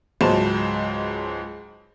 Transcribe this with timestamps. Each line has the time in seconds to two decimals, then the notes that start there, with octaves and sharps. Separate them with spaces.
0.21 C#2 G#2 F#3 C5 A5 E7